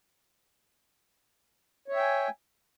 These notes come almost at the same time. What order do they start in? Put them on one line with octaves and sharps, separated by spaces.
C#5 E5 G5 G#5